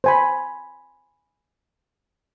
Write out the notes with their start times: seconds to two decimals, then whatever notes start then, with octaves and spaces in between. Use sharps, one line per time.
0.04 C5 G#5 B5